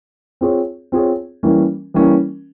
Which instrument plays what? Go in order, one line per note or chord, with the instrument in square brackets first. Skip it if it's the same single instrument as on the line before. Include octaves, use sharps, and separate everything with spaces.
[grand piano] C4 F4 G#4 C#5
C4 F4 G#4 C#5
E3 G3 A#3 C#4 E4
E3 G3 A#3 C#4 E4